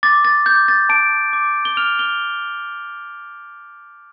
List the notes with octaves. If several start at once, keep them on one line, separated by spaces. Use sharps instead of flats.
D6 A6
A6
D6 G6
A6
A5 D7
D6
G7
F6 F7
G7